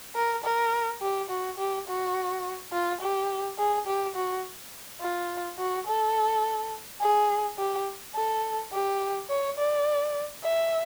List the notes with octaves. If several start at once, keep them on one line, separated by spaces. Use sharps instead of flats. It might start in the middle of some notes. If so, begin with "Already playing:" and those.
A#4
A#4
G4
F#4
G4
F#4
F4
G4
G#4
G4
F#4
F4
F#4
A4
G#4
G4
A4
G4
C#5
D5
E5